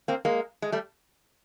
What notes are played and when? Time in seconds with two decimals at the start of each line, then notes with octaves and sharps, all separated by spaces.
0.08 A#3 C4
0.25 G#3 A#3
0.62 G#3
0.72 G3 A3